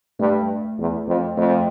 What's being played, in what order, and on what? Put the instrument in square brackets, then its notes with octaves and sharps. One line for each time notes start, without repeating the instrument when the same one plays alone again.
[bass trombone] G2 [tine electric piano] A3
[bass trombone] E2
F2
[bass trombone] F2 [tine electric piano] A3